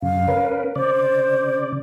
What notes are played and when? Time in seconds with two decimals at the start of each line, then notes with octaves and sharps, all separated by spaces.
0.02 F#2 C#3 F5
0.28 C#4 A#4 B4
0.76 C#3 C5 D5